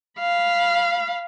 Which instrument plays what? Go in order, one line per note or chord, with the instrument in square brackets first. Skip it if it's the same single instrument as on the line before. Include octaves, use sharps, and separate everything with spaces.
[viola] F5 B5